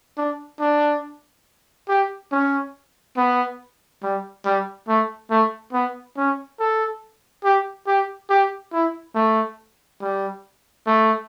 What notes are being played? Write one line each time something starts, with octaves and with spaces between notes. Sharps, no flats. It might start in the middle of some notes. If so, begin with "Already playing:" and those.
D4
D4
G4
C#4
B3
G3
G3
A3
A3
B3
C#4
A4
G4
G4
G4
E4
A3
G3
A3